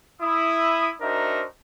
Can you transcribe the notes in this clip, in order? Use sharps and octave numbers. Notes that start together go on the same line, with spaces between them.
E4 D#6
D4 D#4 F#4 A#4 C5 E5